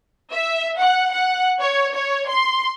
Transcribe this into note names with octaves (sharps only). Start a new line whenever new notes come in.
E5
F#5
F#5
C#5
C#5
C6